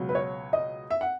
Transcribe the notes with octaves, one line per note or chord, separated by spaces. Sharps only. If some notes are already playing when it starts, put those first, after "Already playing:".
Already playing: C#2 B2 F#3
B4
C#5
D#5
E5
F#5